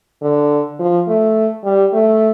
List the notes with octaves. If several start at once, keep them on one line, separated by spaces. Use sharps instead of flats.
D3
F3
A3
G3
A3